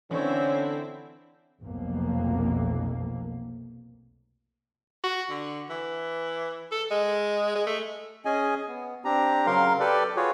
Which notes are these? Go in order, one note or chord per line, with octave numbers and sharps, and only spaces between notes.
D3 E3 C4 C#4 E4 C#5
F1 B1 F2 A#3
F#4
D3
E3
A4
G#3
G#3
A3
C#4 G#4 D#5 G#5
B3
C4 D4 G4 A#5
C#3 F#3 A#4 F5 C6
G4 A4 B4 D5
F4 F#4 G#4 B4 C#5